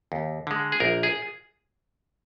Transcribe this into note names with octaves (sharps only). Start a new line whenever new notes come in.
D#2
D3 G#3
G#4
A#1 A#4
G#4